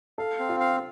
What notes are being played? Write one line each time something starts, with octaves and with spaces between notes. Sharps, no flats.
A4 F5
C4
F4
F5